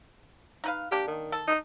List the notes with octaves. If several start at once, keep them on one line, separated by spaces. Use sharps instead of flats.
D#4 B4 F5
A#3 D4 G4
D#3
A4
D#4